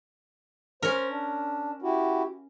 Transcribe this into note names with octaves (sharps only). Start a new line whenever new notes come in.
C#4 A#4 C5
D4
E4 F#4 G4